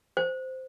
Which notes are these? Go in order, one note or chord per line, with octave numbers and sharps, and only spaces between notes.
C5